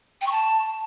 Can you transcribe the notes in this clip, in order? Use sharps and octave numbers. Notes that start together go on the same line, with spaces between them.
G5
C#6
A5